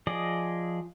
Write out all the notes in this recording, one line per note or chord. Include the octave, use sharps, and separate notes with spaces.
F3 G#4 D5 D#5